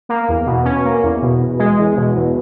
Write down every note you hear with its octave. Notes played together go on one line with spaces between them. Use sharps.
A#3
E2
B2
C#4
A#3
E2
B2
E2
G#3
E2
B2
E2